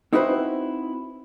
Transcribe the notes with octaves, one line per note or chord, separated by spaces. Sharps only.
C4 D#4 E4 F#4 B4 C5